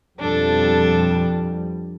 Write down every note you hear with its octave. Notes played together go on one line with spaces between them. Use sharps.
F2 B2 G3 D4 A4